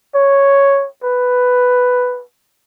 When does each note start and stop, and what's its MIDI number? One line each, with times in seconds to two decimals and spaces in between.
0.15 0.87 73
1.04 2.22 71